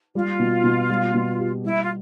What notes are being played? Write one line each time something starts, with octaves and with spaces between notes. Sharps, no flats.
G3 F4
B2
B2
G3
B2
G4
G3 E4
F4